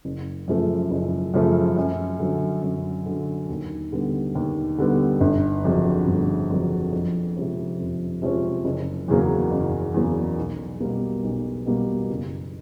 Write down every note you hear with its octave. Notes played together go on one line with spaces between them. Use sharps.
F#1
F#2 C#3 F3 A3
F#1
F#2 C#3 F3 A3
F#2
D3 F#3
F#2
D3 F#3
D#2
D3 G3 B3
D#2
D3 G3 B3
G1
F2 C#3 F#3
G1
F2 C#3 F#3
F2
C3 F3 G#3 C#4
F2
C3 F3 G#3 C#4
F#1
E2 C#3 F#3 A#3
F#1
E2 C#3 F#3 A#3
B1
B2 G3 A#3
B1
B2 G3 A#3
F#1